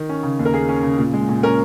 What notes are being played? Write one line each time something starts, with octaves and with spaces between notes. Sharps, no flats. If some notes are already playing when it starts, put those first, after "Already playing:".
Already playing: D#3
C#4
C#3
D#2
A#4
A#3 G#4
C#4
C#3
A#2
G#3
A#2
C#4 A#4